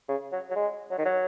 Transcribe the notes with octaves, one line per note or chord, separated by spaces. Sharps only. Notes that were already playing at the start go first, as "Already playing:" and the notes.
C#3
F#3
F#3
G#3
F#3
D#3
F#3